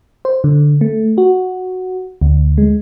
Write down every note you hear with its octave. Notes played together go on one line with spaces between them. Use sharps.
C5
D3
A3
F#4
D2
G#3